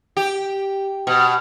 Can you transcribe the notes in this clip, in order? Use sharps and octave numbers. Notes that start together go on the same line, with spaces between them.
G4
B2